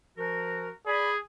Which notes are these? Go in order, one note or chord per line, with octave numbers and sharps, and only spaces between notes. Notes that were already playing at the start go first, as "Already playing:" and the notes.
F3 F#4 A#4
G#4 D5 B5